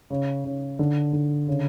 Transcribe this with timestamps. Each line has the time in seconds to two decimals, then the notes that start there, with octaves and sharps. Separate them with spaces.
0.10 C#3
0.45 C#3
0.79 D3
1.13 D3
1.48 C#3